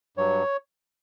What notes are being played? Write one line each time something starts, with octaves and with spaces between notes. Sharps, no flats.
G2 F#3 C#5